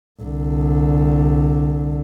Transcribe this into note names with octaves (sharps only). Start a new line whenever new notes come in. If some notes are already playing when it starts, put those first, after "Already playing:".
C2 D3